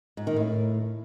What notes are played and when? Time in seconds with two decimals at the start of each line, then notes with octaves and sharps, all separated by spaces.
0.17 G#2
0.27 D#3
0.37 A2